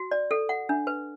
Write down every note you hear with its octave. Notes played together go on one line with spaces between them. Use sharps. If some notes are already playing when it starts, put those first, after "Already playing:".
Already playing: F#4
D5
A4
F#5
D4
B4